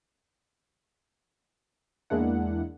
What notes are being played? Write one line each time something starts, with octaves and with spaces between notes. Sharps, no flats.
E2 G#3 A#3 D4 E4 F#5